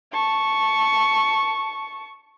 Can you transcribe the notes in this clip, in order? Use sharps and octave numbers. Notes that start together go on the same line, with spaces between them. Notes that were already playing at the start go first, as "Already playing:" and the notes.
A5 C#6